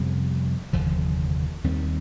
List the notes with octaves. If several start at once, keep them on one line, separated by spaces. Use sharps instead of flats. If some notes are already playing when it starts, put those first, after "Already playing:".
Already playing: F2 C3 G3 B3
F1 D#2 D3 F3
D#2 D#3 G3 C4